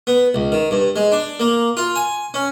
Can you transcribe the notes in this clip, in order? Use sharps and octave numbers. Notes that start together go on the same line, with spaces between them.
B3
C#2
D#3
G2
G#3
D4
A#3
F4
G#5
C#4